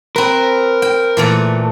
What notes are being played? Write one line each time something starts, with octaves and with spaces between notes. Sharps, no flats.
C4 A#4 B4
G5
A#2 E3 A3